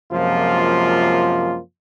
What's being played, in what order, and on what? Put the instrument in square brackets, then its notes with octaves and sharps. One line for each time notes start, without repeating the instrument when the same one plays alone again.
[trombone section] F#2 C3 F3 G#3 A#3 F4